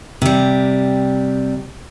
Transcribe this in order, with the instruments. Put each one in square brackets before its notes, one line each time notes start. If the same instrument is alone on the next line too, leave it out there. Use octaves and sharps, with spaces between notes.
[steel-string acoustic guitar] C3 G3